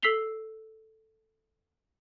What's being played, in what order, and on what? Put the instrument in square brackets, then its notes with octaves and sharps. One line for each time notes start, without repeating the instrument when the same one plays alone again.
[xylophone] A4 E6 B6 C7 F7 G7